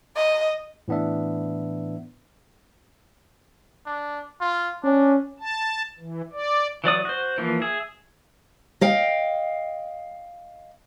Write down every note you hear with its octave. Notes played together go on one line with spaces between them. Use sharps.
D#5
A2 E3 B3 D4 E5
D4
F4
C#4 D4
A5
E3
D5
E3 F#3 D5 D#6
F#4 C5
E3 F3 A#3
G#4 E5
D#5 F5 G5